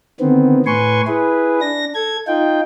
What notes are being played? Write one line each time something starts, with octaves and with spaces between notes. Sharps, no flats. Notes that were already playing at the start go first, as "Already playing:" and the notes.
D3 D#3 B3 C4
A2 B4 G#5 C6 C#6
E4 G#4 B4
D4 A#6
A4 G#6
D#4 F4 G5